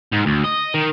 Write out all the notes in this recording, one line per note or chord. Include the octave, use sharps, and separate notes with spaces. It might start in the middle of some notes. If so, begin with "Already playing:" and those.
G#2
D2
D#5
D#3